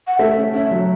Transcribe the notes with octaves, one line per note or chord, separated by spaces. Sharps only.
F#5
A3 E5
C#4
C#4 E5
F#3